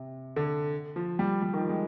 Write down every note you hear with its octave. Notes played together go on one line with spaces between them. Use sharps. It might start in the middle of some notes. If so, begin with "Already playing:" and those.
Already playing: C3
D3
F3
G3
G3
D#3
F3
G#3